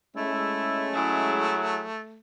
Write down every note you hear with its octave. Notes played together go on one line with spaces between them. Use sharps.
G#3 A3 C#4 E4
F#3 E4 G#4